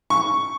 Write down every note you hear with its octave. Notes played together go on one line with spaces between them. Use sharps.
C#6